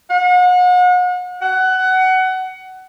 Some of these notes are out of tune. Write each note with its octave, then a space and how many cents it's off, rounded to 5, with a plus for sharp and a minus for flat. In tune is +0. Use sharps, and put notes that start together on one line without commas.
F#5 -40
F#5 +20